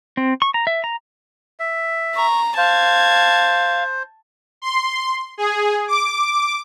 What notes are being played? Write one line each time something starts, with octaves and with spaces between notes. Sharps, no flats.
C4
C#6
A#5
E5
A#5
E5
A#5 C#6
C5 F5 A5 G#6
C6
G#4
D6